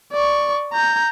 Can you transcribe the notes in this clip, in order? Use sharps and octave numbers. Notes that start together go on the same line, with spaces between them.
D5 C#6
A#5 G6